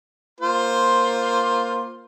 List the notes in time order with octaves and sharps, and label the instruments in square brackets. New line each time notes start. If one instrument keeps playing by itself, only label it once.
[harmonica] A#3 F4 C5